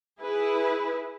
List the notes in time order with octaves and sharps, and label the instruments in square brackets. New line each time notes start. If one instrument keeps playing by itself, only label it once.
[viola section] E4 G#4 B4